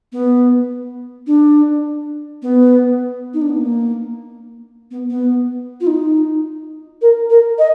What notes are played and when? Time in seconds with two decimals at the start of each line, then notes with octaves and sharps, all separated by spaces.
0.12 B3
1.27 D4
2.42 B3
3.34 D#4
3.42 D4
3.49 B3
3.57 A#3
4.91 B3
5.10 B3
5.81 F4
5.87 D#4
7.02 A#4
7.30 A#4
7.59 D#5